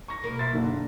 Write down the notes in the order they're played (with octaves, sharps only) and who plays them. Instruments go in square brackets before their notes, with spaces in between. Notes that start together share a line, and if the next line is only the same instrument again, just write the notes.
[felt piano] C#6 A#6
[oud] B2 A#3 A#4
[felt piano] E5 C6 A6
F#1 D3